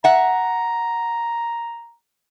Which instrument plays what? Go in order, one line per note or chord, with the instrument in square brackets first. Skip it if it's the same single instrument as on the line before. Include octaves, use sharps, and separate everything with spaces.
[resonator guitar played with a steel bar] E5 F#5 [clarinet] A#5